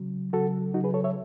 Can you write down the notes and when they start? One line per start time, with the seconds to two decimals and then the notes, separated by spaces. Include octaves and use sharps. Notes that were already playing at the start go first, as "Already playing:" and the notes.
Already playing: C#3 F#3
0.33 C#3 F#3 F#4 A4
0.74 C#3 F#3 D#4 F#4
0.84 G#4 B4
0.94 A4 C#5
1.04 C#5 E5